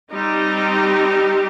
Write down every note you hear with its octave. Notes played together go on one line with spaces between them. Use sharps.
G3 C4 D#4 G4